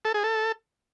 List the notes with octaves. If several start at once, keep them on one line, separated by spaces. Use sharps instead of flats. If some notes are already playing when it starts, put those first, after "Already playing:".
A4
G#4
A4